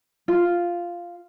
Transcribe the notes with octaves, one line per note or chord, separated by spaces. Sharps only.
F4